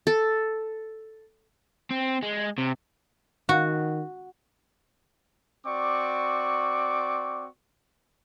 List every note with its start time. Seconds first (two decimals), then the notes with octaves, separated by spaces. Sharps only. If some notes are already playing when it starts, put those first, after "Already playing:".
0.07 A4
1.91 C4
2.23 G#3
2.58 C3
3.49 D#3 F#4
5.66 C4 F#4 D5 C#6 D6